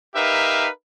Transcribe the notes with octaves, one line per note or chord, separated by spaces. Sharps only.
D#4 G4 A#4 B4 E5 F5